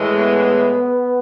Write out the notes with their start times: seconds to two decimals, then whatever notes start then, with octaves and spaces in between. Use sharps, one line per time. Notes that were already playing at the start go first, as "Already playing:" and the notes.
Already playing: A2 E3 G#3
0.13 B3